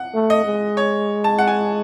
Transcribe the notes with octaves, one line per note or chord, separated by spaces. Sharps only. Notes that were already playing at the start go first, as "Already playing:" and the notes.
Already playing: F#5
A3
D#5
G#3
C#5
A5
F#5
G#5